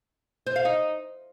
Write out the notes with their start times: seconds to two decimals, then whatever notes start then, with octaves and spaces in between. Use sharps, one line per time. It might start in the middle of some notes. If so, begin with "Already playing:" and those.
0.47 C5
0.56 F5
0.65 D#4